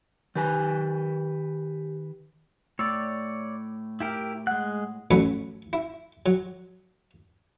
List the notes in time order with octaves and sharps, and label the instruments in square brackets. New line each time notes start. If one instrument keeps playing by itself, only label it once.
[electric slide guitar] D#3 B4 G#5 [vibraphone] G4
[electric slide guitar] A2 [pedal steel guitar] C#5 D5 [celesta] E6
[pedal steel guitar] E4 G4 A#4
[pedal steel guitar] G#3 F#6 [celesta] F#5
[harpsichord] A1 A2 F#3 C#4 B5
E4
F#3